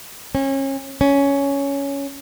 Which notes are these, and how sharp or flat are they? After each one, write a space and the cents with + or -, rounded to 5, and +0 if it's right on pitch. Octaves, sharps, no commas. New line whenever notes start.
C#4 -30
C#4 +10